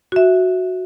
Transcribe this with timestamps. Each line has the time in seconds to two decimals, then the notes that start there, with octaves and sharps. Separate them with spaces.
0.12 F#4 E5